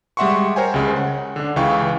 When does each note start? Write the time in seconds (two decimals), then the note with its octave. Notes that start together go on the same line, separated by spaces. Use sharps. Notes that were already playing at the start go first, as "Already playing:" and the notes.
0.17 G3 G#3 E5 F#5 C6 C#6
0.56 A#4 C5 C#5 G5 G#5
0.74 C#2 C#3 G#3
0.96 F#5
1.36 D3 D4
1.56 C#2 C#3 E3 F5 G5 C#6